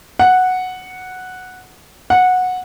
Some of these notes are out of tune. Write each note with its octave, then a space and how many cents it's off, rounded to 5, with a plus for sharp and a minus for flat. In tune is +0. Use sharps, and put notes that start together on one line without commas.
F#5 -5
F#5 -15